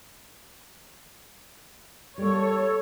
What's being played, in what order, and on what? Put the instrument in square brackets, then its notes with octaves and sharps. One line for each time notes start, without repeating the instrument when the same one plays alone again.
[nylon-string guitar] G3 A#3 [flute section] A4 [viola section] C#5